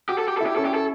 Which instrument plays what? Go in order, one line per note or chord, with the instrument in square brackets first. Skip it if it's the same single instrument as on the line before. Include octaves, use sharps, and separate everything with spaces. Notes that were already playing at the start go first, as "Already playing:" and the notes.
[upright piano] F#4 [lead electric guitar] G4
[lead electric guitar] A4
G4
[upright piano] E4 [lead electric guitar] A4
[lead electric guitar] G4
[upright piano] C#4 [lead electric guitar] A4
[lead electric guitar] G4
A4